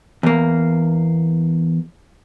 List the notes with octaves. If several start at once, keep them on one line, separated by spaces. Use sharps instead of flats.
E2 A#3